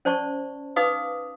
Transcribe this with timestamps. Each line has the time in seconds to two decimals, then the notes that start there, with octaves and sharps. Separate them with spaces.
0.05 C#4 C5 D5 A5 C#6
0.76 D#4 B4 F5 D6 D#6